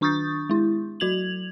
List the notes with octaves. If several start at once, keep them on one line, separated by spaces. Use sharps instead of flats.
D#3 D4 C#6 D#6 G6 A6
G#3 E4
F#3 F#4 G#6 F7 F#7